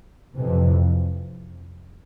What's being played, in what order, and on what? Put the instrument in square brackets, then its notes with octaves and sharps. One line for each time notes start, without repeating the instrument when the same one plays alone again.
[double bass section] F2 C3 E3